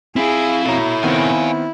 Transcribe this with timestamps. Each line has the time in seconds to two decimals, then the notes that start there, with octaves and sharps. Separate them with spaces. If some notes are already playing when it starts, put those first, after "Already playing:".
0.16 C4 E4 G#4 F5
0.65 B2 E4 A4 C#5 A#5
1.03 D#3 B3 C4 F5 G#5